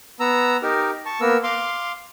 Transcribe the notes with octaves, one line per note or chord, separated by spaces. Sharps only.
B3 A#5 E6
D#4 G4 A#4
A5 C#6
A#3 B3 A#4 E6
F5 C6 D6